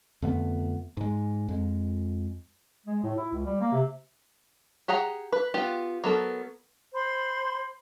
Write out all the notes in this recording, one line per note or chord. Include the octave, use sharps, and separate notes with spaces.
F2 D3 A3 B3
G#2 G#3
F2 G#3
G#3
A2
E4
C#2
G3
A#3
C3
G4 G#4 F#5 A#5
B4
B3 F4 G4
F#3 B3 A4 A#4
C5 B5 C6